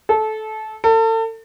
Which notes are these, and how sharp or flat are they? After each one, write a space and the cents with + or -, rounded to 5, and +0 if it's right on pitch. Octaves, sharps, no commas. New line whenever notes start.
A4 -20
A4 +35